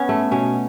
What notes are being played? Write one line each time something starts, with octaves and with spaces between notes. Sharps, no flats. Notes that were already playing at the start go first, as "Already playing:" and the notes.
Already playing: B3 C#4
A3
B2 C#4